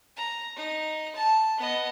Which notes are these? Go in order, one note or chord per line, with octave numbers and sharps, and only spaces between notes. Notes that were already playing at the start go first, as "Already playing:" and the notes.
A#5
D#4
A5
B3 D#5